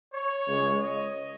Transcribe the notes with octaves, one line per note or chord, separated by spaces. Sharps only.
C#5
C#2 C#3 G#3
D#5